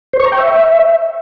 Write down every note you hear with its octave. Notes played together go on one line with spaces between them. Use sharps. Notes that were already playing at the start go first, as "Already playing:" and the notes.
C5
C#6
A#5
G5
E5